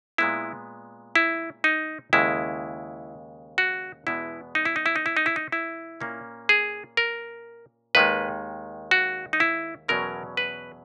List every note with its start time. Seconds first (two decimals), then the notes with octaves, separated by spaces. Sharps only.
0.18 A#2 G#3 B3 E4
1.16 E4
1.64 D#4
2.13 D#2 C#3 G#3 E4
3.58 F#4
4.07 E2 B2 G#3 B3 E4
4.55 D#4
4.65 E4
4.76 D#4
4.86 E4
4.96 D#4
5.06 E4
5.17 D#4
5.26 E4
5.36 D#4
5.52 E4
6.01 A#2 A#3 C#4
6.49 G#4
6.97 A#4
7.95 D#2 D#3 G#3 B4
8.91 F#4
9.33 D#4
9.40 E4
9.88 E2 B2 F#3 C#4 A#4
10.37 B4